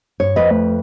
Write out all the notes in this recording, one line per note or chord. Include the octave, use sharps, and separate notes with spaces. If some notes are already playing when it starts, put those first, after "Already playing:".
G2 C#5
F2 B4 D#5
A3